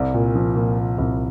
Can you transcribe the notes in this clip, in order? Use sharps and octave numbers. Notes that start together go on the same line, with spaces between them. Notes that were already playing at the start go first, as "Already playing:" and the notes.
Already playing: C2 D5
A#2
F3
A#2
A#2
C2